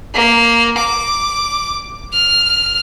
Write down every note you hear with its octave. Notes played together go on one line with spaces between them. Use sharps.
A#3
D6
F6